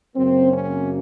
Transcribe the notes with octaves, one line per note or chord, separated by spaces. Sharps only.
F#2 C#3 F#3 A#3 C4
C#4